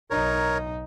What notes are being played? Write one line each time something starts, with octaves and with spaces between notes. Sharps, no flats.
B1 D#4 A#4 C#5